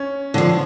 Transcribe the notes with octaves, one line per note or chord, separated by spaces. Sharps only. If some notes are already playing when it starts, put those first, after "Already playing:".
Already playing: C#4
D3 F3